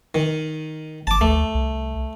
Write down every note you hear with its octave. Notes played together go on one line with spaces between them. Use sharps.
D#3
G1 A5 D6
D2 A3
C2